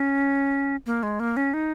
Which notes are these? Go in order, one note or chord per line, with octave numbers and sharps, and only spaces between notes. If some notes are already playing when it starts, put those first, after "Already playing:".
Already playing: C#4
A#3
G#3
A#3
C#4
D#4